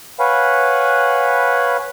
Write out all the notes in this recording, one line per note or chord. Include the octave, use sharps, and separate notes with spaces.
B4 C#5 F5 F#5 G#5 B5